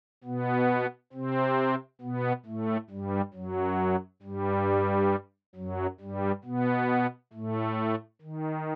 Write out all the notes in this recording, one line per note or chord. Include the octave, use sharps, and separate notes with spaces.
B2 B3
C3 C4
B2 B3
A2 A3
G2 G3
F#2 F#3
G2 G3
F#2 F#3
G2 G3
B2 B3
A2 A3
D#3